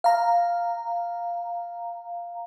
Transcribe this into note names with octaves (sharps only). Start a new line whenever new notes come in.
F5 A#5